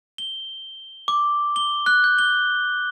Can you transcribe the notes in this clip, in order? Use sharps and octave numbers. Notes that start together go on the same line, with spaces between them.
G7
D6
G7
F#6
G6
G7